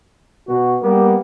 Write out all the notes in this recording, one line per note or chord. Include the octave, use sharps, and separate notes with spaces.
B2 F#4
G3 A#3 B3